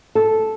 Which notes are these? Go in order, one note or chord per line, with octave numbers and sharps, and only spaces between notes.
A4